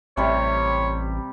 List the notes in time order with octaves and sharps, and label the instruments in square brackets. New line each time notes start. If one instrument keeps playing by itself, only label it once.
[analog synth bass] A1 [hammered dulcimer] C3 G3 [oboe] C#5